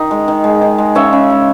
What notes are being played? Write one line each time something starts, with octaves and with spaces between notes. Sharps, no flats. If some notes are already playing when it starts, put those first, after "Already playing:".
Already playing: D#3 D#5
G#3
D#3
G#3
D#3
G#3
C#3 C#5 E5
C#3
G#3